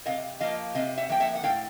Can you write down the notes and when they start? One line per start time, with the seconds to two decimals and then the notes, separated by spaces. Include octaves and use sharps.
0.06 C3 D#5 F5
0.40 F3 A#3 D#5 F5
0.75 C3 D#5 F5
0.98 E5 F#5
1.09 F3 A#3 G5
1.20 E5 F#5
1.35 F#5
1.43 A2 F5 G5